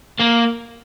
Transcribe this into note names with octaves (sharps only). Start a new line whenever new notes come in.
A#3